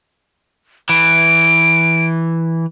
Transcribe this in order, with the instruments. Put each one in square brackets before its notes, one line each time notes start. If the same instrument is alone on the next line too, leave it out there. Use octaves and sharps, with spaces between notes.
[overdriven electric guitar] E3 [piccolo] D7